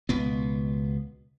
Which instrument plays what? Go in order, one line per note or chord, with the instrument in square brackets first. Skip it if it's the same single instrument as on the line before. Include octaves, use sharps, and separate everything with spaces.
[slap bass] C#2 B2 B3